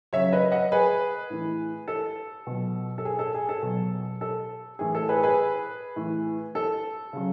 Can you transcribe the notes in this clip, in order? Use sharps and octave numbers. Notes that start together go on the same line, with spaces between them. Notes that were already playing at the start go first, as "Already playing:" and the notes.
C#3 F#3 C#5 E5
B4 D#5
D#5 F#5
G#4 B4
A2 E3
A4
B2 F#3
A4
G#4
A4
G#4
A4
B2 F#3
A4
A2 E3 G#4
A4
G#4 B4
G#4 B4
A2 E3
A4
C#3 F#3